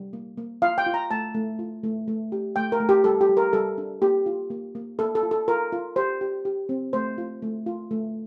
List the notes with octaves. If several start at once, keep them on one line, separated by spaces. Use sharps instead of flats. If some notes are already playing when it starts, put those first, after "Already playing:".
Already playing: G3
A#3
A#3
F4 F5
G5
F4
A#5
A3 A5
A3
F4
A3
A3
G4
A3 G5
A#4
A3
G4
G3 A4
G4
G3
A#4
G3 A4
D4
A#3 G4
F4
A#3
A#3
A#3 A4
A4
F4
A4
F4 A#4
F4
G4 C5
G4
G4
C4
A3 C5
F4
A3
F4
A3